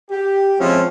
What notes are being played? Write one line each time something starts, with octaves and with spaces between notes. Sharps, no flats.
G4
F3 G#3 C4 C#4 E4 F4